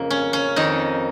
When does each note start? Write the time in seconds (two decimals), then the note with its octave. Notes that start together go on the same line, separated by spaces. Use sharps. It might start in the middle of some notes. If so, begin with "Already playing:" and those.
Already playing: F2 C#3 A#3
0.10 C#4
0.33 C#4
0.56 F2 D#3 D#4